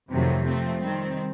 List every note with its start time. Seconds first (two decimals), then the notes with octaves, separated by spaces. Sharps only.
0.11 F2 C3 D#3 F#3 A3
0.46 F3 A3 C4
0.81 D#3 G3 C4